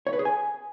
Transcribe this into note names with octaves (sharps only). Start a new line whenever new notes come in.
C#5
B4
G#4
G#5